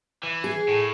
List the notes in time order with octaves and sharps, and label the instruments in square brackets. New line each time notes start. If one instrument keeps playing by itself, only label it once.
[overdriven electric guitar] E3
[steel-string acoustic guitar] G#4
[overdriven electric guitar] A2